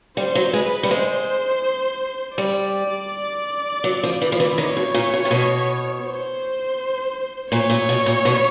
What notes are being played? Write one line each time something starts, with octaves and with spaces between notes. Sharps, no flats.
G3 C5
F#3
G#3 B4
G3
G#3 C5
G3 D5
F#3
F3
E3
F3
E3
D#3 C#5
B2
A#2
B2
C3
B2
C5
A#2 C#5
A#2
B2
A#2
B2